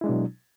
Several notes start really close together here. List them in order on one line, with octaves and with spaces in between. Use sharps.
E4 G#3 D4 B2 F#3